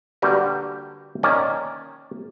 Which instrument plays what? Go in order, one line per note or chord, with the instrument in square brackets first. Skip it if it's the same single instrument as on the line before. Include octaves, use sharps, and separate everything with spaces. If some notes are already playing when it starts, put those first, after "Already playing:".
[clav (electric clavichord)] D3 G3 A#3 F#4 G4 B4
D#3 A#3 C#4 D5